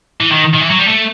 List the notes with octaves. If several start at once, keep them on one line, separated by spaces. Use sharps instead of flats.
E3
D#3
D#3
E3
F#3
G3
A3